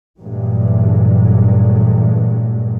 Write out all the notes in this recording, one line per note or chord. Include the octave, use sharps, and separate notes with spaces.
G2 A#2 E3 F#3 G#3 A3